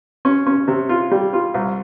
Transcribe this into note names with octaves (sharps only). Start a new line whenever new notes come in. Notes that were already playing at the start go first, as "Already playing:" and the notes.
C#4
C#4
C3
F4
G3
F4
C2